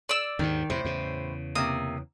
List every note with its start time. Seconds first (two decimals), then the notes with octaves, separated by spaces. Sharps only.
0.09 D5 E6
0.39 D#2 G#2 D#3
0.70 E2 A2 C3 C5
0.85 E2 C#3
1.55 C3 A#3 D#6